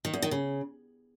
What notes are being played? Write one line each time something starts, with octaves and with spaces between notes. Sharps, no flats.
D#3
E2
D#3
C#3